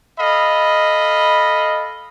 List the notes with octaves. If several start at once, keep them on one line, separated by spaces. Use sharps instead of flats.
A4 D#5 F5 B5